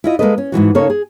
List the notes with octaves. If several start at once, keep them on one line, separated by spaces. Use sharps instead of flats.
E4 F4 D#5
G#3 A#3 B3 A4 B4 D#5
C#4
G#2 B2 E3 F#4
C#3 A#3 C#4 D#4 A4 C#5
G#4